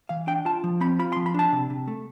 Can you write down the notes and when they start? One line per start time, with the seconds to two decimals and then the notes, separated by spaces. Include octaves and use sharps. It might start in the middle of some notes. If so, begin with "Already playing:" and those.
0.09 E3 F5
0.27 D4 G5
0.45 F4 A5
0.64 F3
0.81 C4 B5
0.99 F4 B5
1.13 C6
1.16 F3
1.26 B5
1.34 D4 A5
1.52 C3
1.70 C3
1.88 A3